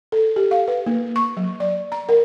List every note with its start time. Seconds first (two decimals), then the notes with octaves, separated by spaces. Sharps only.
0.12 A4
0.36 G4
0.51 F5
0.68 B4
0.87 A#3
1.16 C#6
1.37 F#3
1.60 D5
1.92 A#5
2.09 A#4